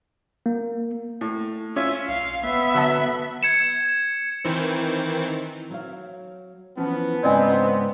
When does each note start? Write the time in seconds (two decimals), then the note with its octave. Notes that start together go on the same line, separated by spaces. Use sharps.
0.46 A#3
1.21 A2
1.76 C#4 F4 E5
2.08 B1 F5
2.44 G#1 B3 E5
2.74 D3 F#3 F#5 A5
3.43 G#6 C#7 E7
4.45 D#3 E3 C4
5.70 F#3 C#5 F5
6.77 E3 F3 B3 C#4
7.23 G#2 C#3 C4 D5 D#5 G#5